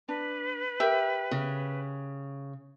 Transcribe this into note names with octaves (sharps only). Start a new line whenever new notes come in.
D4 B4
G4 A#4 E5
C#3